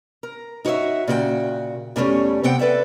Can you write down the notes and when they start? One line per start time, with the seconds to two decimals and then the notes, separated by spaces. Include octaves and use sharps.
0.23 A#4
0.65 D#4 F#4 C#5 D5 E5
1.08 A#2 C#3 F#4 C#5 G5
1.96 E2 D3 G3 A3 C#4
2.43 C3 B3 C4 F#5 G5
2.59 A4 B4 D5 E5